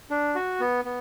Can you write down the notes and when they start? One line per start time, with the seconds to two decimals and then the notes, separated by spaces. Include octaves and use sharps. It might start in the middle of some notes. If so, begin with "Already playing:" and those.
0.10 D4
0.35 F#4
0.60 B3
0.85 B3